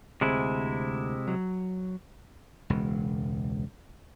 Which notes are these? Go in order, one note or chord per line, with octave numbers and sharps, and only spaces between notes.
D2 C3 G#3 C4 E4 G#4
F#3
E1 C#2